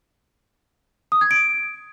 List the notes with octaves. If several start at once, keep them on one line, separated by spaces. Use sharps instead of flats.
D#6
G#6
D7